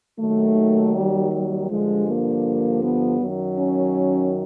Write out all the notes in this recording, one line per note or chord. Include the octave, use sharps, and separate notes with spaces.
D#2 D#3 F#3 A3
G3
G3
G2 D3 F3 G#3
A#3
B3
F#2 D#3 F#3
C#4